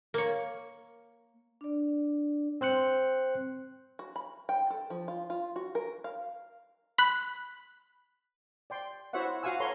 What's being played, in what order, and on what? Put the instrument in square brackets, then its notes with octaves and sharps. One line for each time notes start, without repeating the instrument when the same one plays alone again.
[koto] A#3 C#5
[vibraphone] D4 D5
[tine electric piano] C4 C5 F#6 C#7
[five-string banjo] F#4
B5
G5
A4
F3
F4
F4
F#4
A#4
F5
[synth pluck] B5 F#6
[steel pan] D5 G5 C6
E4 F#4 C5 C#5 E5 F#5
F4 F#4 F5 F#5 G#5 E6
A4 B4 C#5 A#5 C6